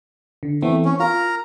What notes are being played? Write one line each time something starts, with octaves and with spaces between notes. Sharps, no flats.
D3
E3 A3 B3 C4
C#4
F4 A#4 A#5